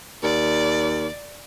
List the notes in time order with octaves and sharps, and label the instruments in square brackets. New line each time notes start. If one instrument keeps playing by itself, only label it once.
[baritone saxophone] D#2 [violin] D5